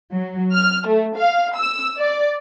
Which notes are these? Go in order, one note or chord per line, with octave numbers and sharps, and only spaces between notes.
F#3
F6
A3
F5
E6
D5